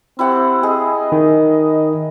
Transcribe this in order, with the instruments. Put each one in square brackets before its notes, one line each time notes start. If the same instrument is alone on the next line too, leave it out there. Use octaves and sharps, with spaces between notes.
[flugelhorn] C4 [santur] E4 G4 F#5
[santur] G#4 [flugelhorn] D#5
[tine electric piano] D#3